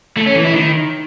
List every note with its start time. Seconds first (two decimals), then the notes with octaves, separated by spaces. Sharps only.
0.17 A3
0.26 C#4
0.36 E3
0.45 E4
0.54 D#3